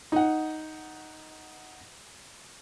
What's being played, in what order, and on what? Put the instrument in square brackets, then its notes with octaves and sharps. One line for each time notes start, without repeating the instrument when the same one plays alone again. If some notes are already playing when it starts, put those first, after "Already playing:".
[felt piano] D#4 F#5